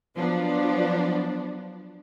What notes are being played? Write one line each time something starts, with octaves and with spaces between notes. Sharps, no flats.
F3 F#3 B3 D4